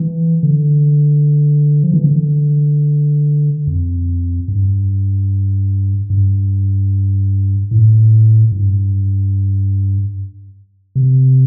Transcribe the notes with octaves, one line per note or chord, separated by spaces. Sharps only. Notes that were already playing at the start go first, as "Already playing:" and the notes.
Already playing: E3
D3
F3
E3
D3
F2
G2
G2
A2
G2
C3